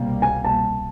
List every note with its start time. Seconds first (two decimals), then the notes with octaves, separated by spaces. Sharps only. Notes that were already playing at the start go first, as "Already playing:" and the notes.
Already playing: C2 B2 G3 A#3
0.22 G#5
0.44 A5